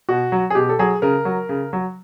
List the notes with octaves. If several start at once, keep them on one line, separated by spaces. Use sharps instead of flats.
B2 F#4
F#3
G#4
B2 G4
A4
F#3 G#4
C#3 A#4
F#3
C#3
F#3